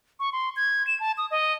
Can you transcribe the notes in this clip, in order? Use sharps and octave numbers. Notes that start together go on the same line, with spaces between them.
C#6
C6
G#6
E7
A5
D#6
D#5